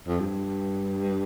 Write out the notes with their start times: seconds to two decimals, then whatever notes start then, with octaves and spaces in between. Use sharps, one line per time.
0.07 F2
0.20 G2